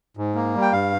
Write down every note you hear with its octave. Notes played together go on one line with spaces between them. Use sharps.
G#2
A#3
G3
G5
G2 F5